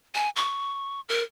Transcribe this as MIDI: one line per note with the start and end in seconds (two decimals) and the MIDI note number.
0.15 0.30 80
0.36 1.01 85
1.09 1.23 70